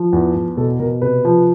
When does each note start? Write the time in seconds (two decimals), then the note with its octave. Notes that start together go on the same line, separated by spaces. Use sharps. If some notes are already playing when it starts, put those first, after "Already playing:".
Already playing: F3
0.13 E2
0.35 E2
0.57 B2 A4
0.79 B2 A#4
1.02 C3 B4
1.25 F3